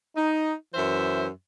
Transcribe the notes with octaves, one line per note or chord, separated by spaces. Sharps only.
D#4
F#2 E3 C5 E5